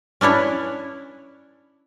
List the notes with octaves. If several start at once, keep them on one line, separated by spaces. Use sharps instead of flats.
C#4 D4 E4 C#5